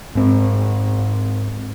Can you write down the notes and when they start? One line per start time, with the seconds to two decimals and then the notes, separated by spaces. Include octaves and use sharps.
0.15 G#2 C4